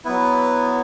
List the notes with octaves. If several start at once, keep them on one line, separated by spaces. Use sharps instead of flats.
F#3 B3 E4 B4